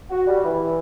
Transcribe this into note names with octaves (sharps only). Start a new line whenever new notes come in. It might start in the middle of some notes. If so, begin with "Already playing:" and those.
F#4
G3
E3